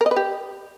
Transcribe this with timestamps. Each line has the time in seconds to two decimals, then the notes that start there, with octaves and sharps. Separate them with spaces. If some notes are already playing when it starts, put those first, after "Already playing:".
0.01 A#4
0.06 D#5
0.11 B4
0.16 G4